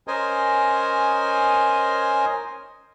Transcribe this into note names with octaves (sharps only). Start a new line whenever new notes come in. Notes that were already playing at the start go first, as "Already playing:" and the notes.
C#4 A#4 C5 D#5 G#5